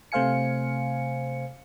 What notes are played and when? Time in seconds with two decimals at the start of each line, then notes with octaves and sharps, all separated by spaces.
0.12 C3 A3 C5 F5 G#5 C#7